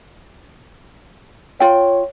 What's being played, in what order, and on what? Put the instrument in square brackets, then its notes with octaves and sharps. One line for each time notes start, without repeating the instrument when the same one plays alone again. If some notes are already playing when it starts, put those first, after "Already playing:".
[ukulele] F4 G5 [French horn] C#5